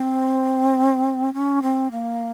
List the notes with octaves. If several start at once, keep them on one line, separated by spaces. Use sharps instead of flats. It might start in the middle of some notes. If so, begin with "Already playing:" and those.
Already playing: C4
C#4
C4
A#3